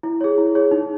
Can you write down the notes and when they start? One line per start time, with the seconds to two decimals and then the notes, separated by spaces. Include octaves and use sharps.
0.03 E4
0.21 G#4 C#5
0.38 E4
0.55 G#4 C#5
0.71 D#4